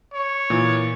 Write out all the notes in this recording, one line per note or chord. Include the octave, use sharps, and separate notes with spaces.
C#5
A#2 E3